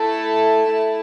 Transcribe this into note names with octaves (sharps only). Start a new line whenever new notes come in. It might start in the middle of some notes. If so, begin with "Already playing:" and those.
Already playing: A3 E4 A4 A5
A3 E4